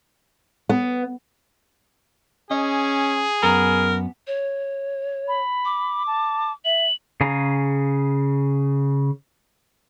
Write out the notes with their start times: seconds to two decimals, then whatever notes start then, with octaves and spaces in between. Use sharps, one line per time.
0.69 B3
2.51 C#4 G#4 D#5
3.43 F#2 B3 A#4 A#5
4.27 C#5
5.28 B5
5.65 D6
6.07 A5
6.65 E5 F#7
7.21 C#3 G#4 F5 G#5 A#5